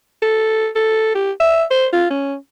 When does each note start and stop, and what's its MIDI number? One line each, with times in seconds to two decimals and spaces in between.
0.22 0.68 69
0.75 1.13 69
1.15 1.32 67
1.40 1.64 76
1.71 1.87 72
1.93 2.09 65
2.10 2.36 61